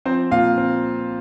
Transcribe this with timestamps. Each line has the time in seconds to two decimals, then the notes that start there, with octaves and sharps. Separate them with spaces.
0.05 F3 C4 C5
0.31 A#2 F4 F5
0.58 C4